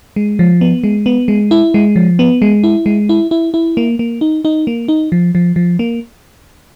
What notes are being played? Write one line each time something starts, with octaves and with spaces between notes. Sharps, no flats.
G#3
F3
B3
G#3
B3
G#3
E4
G#3
F3
B3
G#3
E4
G#3
E4
E4
E4
A#3
A#3
D#4
D#4
A#3
D#4
F3
F3
F3
A#3